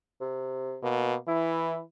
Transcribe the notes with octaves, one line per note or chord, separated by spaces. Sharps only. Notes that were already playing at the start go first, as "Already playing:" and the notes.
C3
B2 A#3
E3 E4